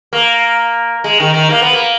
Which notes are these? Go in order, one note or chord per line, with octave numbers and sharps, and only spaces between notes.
A#3
G#3
D#3
D#3
A#3
B3
A#3